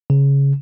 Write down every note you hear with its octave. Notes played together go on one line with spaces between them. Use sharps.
C#3